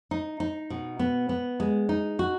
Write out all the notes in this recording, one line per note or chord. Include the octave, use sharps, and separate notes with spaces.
D#4
D#4
B2
B3
B3
G#3
D#4
F#4